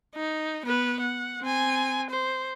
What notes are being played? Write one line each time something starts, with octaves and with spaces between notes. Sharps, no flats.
D#4
B3 B4
F#5
C4 G#5
C5